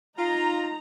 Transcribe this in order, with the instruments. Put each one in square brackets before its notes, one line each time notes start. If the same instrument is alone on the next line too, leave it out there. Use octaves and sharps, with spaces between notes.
[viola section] D#4 A#5 [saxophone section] F4